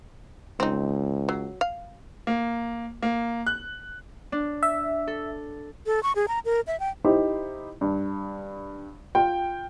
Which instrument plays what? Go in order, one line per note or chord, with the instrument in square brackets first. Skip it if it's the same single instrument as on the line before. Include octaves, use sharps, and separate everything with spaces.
[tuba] C#2 [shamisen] C4 D#4
[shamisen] F#3
F5
[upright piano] A#3
A#3
F#6
[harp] D4
[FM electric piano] E5
[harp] A4
[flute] A4
C#6
G#4
A#5
A#4
E5
G5
[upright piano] D#4 E4 G4 C5
G2
F4 G5